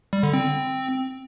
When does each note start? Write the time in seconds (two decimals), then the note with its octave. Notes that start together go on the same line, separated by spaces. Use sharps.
0.13 G3
0.23 D3
0.34 C4